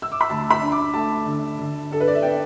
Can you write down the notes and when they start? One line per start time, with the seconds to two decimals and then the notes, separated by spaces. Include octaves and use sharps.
0.02 E6
0.12 D6
0.21 B5
0.30 D2 A5
0.51 B5
0.61 D4
0.72 D6
0.94 A3 A5
1.26 D3
1.59 D3
1.91 D4 A4
2.00 B4
2.08 D5
2.15 E5
2.22 B3 G5